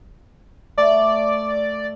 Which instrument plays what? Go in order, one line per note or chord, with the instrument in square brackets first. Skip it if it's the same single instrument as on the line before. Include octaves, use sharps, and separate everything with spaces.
[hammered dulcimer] A3 [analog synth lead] D5